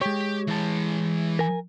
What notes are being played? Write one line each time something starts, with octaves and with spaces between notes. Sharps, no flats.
G#3 G4 C#5
E3 A5
A#4 G#5